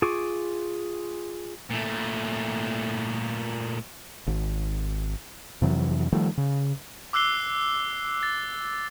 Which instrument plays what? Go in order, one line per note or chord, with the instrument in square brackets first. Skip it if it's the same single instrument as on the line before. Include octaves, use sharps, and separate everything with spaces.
[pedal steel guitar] F4 G#4 C#6 D6
[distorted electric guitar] A#2 A3
[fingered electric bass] G#1
F2 C3 E3 F#3
D#3 F3 G3 A3
C#3
[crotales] D6 E6 F#6 C7 G7
A6